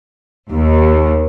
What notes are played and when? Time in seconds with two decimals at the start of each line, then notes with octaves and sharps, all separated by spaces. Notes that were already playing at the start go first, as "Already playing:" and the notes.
0.51 D#2